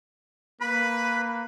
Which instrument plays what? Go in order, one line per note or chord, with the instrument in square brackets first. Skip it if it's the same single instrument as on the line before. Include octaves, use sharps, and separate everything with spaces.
[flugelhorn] A#3 [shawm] B4 [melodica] B5